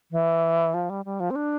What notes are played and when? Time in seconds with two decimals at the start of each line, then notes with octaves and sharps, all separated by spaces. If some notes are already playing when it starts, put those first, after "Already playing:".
0.11 E3
0.74 F3
0.90 G3
1.05 G3
1.20 F3
1.30 C4
1.36 D4